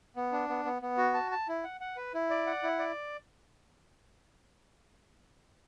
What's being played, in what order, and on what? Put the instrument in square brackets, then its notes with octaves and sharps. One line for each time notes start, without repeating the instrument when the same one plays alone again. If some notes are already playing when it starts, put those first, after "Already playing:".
[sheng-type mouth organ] B3
D4
B3
B3
B3
F#4
A5
A5
E4
F#5
F#5
B4
E4
D5
F#5
E4
D5